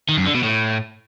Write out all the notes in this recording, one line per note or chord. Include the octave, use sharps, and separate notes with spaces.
D#3
F#2
D3
B2
A2